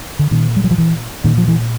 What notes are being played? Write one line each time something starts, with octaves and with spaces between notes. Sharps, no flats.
D3
A#2 D#3
G3
F#3
F3
E3
A#2 D#3
F3
E3